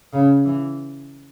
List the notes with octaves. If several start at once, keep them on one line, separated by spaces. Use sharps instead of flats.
C#3
E3